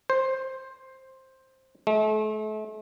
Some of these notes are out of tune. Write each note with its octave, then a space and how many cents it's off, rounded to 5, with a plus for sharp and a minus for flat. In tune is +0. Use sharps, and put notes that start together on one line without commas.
C5 +10
A3 -40